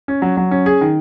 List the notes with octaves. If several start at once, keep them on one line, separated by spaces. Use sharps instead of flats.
C#4
F#3
F#3
C#4
G#4
D#3